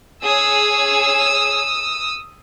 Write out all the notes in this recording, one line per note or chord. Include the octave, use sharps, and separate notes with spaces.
G#4 C#5 D#6 E6